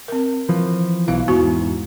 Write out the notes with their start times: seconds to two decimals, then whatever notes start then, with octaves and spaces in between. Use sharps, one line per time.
0.08 C4 A#4
0.49 E3 F3
1.08 B1 B2 E3 F5
1.28 E2 G#2 B3 E4 F#4